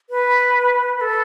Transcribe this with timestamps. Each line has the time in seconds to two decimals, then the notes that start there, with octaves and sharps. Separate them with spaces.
0.10 B4
0.97 B4
1.01 A4